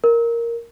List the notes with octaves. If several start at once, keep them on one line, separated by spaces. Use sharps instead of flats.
A#4